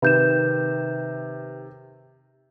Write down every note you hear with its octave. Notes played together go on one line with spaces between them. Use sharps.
C3 D#3 B4 G6 E7